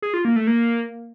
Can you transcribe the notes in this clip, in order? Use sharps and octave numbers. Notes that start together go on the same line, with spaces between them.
G#4
F4
A#3
A3
A#3